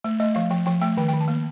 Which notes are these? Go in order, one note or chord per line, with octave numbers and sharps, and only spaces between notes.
A3
A3 D#5
F3 F5
F3 G5
F3 G5
A3 G5
D#3 G5
G5
D#3
A5
A#3